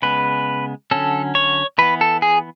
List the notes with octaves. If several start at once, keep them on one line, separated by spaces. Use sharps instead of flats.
C#3 G#3 B3 B4
D3 F#3 C#4 A4
C#5
E3 B3 B4
A4
G#4